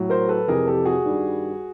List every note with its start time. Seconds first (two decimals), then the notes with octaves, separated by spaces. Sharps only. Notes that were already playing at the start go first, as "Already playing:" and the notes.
Already playing: A2 F#3
0.10 A#4 C5
0.29 A4 B4
0.48 F2 C3 E3 G#4 A#4
0.67 G4 A4
0.85 F#4 G#4
1.05 G2 D#3 G3